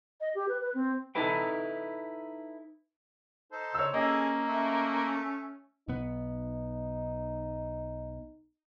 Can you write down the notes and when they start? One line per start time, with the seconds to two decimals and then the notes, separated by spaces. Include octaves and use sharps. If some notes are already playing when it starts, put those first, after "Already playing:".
0.21 D#5
0.35 G4
0.49 B4
0.61 B4
0.74 C4
1.15 D#4 E4 A4 B4 G5
3.52 D#4 A4 C5
3.74 C#3 C#5 E6
3.94 A#3 C#4 G#4 A4 D#5
4.47 A3 C#4 E5
5.88 B1 B3 D#4